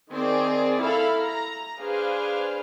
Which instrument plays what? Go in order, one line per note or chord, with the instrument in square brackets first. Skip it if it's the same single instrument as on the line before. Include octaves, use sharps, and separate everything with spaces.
[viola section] D#3 C4 G#4 D5
E4 A4 E5 F5 B5
A#5
D4 G#4 B4 C5 F5